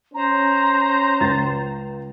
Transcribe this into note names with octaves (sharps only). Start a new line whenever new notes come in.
C#4 C5 A#5
C#2 A6